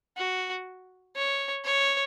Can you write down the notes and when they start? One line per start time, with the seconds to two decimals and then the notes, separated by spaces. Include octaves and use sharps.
0.17 F#4
1.16 C#5
1.64 C#5